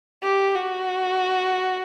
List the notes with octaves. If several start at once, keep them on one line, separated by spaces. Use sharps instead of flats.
G4
F#4